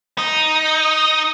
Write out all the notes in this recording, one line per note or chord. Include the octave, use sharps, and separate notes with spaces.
D#4